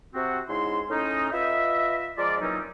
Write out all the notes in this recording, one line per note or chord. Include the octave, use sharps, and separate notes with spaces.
C3 C4 F#4
G#2 C#3 E4 C6
A2 C#4 D#4
F4 B4 D#5 E5
F3 G#3 F4 A#4 D5
A#2 E3 F#3 C4 C#4 D#4